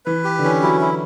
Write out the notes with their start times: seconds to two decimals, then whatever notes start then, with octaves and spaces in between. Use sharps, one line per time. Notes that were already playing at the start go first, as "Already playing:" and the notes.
0.06 E3 B4
0.24 G4
0.39 D3
0.44 E3 C#4
0.62 F#3 E4
0.81 E4